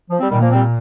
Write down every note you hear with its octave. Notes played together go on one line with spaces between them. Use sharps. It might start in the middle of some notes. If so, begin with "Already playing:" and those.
F3
G3 C4
A#2 D#3 G3
F3 A#3
G3 C4